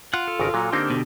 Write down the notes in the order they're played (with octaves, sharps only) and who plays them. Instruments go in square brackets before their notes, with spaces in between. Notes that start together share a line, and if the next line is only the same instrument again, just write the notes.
[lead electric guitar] F4 [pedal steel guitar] F#5 F#6
[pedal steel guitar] A4
[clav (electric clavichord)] G#1 C#3 A#4
A#2 F#3
[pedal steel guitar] D3 D4 G4 [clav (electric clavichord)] A#3 C4 D#4
[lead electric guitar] B2